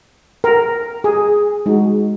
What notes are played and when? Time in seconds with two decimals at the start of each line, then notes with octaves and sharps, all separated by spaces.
0.44 A#4
1.04 G#4
1.66 G#3 D#4 F#4